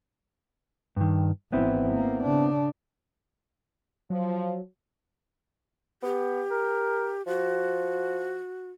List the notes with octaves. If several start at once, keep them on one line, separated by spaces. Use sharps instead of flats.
G2 D#3
G#1 E3 B3 C4 E4
A#3
C#3 D4
F3 F#3
B3 G4
A#4
F3 F#4